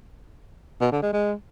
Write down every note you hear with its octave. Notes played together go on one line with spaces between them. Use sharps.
B2
D3
G#3
G#3